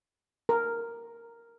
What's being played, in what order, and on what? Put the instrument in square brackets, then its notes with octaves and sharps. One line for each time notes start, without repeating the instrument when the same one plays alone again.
[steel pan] A#4